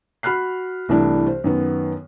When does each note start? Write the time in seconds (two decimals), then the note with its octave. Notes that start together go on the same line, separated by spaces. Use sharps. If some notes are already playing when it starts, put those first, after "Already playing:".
0.23 F#4 B5 F6 F#6 C7
0.89 C2 E3 A3 D4 E4
1.27 C5
1.44 F#2 D#3 B3